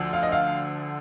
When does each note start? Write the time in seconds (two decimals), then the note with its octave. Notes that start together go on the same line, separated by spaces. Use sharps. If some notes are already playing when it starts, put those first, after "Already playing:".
Already playing: D2 D3 F3
0.13 F5
0.23 D#5
0.32 F5